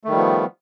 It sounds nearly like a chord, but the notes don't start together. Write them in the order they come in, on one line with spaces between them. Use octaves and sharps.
A3 D#3 G3 F3 B3